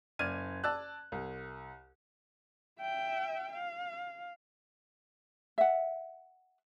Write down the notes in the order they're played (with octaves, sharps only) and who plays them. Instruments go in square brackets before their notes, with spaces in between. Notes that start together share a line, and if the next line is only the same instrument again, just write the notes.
[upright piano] F#1 D5 F6 G#6 D#7
D5 A5 E6 F#6
C2
[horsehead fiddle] E5 G5
F5
[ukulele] E5 F#5